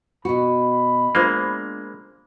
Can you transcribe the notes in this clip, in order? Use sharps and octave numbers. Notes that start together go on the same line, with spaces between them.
B2 F#4 B5
G#3 A#3 D4 F4 C5